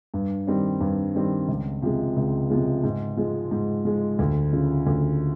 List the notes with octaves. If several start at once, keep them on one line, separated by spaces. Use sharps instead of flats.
G2
D#3 G3 C4
G2
D#3 G3 C4
C#2
C3 F3 G#3
C#2
C3 F3 G#3
G#2
F3 G#3
G#2
F3 G#3
D2
C#3 F3
D2